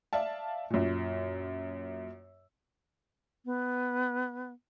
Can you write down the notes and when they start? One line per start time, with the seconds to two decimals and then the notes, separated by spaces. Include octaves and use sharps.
0.13 D5 E5 F5 A5
0.70 F#2 A#2
3.45 B3